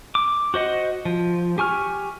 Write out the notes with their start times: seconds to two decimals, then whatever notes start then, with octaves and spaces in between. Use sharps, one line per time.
0.15 D6
0.54 F#4 C5 D#5 F#5
1.05 F3
1.58 G4 G#5 C#6 F6